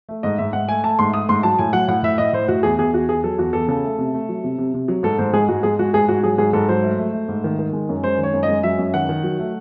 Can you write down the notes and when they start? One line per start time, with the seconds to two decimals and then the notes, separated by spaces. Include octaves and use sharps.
0.09 A3
0.23 G#2 D#5
0.38 G#2 E5
0.53 G#2 F#5
0.68 A3 G#5
0.84 A3 A5
0.99 G#2 C6
1.13 A3 D#6
1.29 G#2 C6
1.43 F#3 A5
1.59 A2 G#5
1.73 F#3 F#5
1.88 A2 F#5
2.03 A2 E5
2.18 A2 D#5
2.33 A2 C5
2.48 A2 F#4
2.63 E2 G#4
2.78 E2 G#4
2.93 E2 F#4
3.09 E2 G#4
3.23 F#3 A4
3.38 E2 F#4
3.53 E2 A4
3.68 C#3 A4
3.84 A3
3.98 C3
4.14 A3
4.29 F#3
4.44 C3
4.58 C3
4.74 C3
4.88 F#3
5.03 G#2 A4
5.18 G#2 C5
5.33 G#3 G#4
5.48 G#2 F#4
5.63 G#3 G#4
5.79 G#3 F#4
5.93 G#2 G#4
6.08 G#2 F#4
6.23 F#3 G#4
6.38 G#2 G#4
6.53 G#2 A4
6.69 F#3 C5
6.83 A3
6.98 A3
7.13 A3
7.28 G#2
7.44 D#3
7.59 D#3
7.73 G#3
7.89 F#2
8.03 G#3 C5
8.18 D#3
8.23 C#5
8.33 F#2
8.43 D#5
8.49 G#3
8.63 F#3 E5
8.78 F#2
8.94 D#3 F#5
9.09 D#3
9.24 F#3
9.39 A3